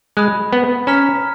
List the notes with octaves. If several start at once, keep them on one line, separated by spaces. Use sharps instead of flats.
G#3 B5 D#6 F#6
B3
C#4 A#5 F6 B6